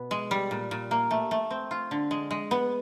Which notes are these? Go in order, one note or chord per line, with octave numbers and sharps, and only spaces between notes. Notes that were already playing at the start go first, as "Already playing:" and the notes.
Already playing: B2 B3
G#3
G3
A#2
A#2
A#3
A3
A3
C4
F4
D3
G#3
G#3
B3